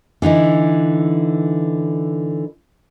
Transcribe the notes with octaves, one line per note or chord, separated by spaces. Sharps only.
D3 E3 D#4 E4